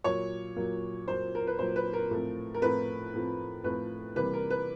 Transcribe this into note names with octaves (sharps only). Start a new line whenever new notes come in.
A#2 F#3 A#3 C#5
A#2 F#3 A#3
A#2 F#3 A#3 C5
A#4
B4
A#2 F#3 A#3 C5
B4
A#4
A2 F3 A3 C4
A#4
A2 F3 A3 C4 B4
A2 F3 A3 C4
A2 F3 A3 C4 B4
C3 E3 G3 A#3 B4
A#4
B4